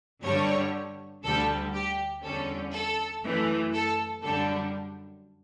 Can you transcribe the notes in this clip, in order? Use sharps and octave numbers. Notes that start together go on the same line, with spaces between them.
G2 D3 G3 D4 C#5
D2 D3 G3 A4
G4
E2 D3 G3 C#4 A4
A4
F#2 E3 A3
A4
F#2 D3 G3 D4 A4